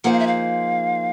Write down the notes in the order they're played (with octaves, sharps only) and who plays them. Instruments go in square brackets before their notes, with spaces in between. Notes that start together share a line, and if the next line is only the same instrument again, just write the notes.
[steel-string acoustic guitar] F3 A#3 D#4 G#4 C5 [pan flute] F#5
[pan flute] F5
E5
F5